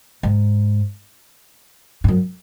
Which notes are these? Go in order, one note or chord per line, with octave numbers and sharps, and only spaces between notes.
G#2
G#2
F#2